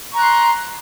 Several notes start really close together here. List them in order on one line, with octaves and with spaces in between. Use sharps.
C#6 A#5 F#6 C6